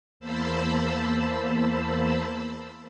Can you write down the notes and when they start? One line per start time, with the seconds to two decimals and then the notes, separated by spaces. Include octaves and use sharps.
0.20 E2 A#3 C5 A5 B5 E6